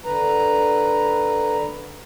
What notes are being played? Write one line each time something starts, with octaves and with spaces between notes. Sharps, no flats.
D3 B4 A#5